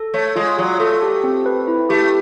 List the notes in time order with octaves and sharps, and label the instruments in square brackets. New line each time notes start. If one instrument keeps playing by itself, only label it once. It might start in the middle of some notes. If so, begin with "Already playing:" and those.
Already playing: [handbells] A4
[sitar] A3 [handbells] C#5
[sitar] G#3 [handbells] F4
[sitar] F#3 [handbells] F4
[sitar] A3 [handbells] A4
[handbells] G4
C4
B4
E4
[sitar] A3 [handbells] G4